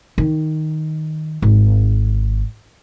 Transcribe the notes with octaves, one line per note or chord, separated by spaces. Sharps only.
D#3
G#1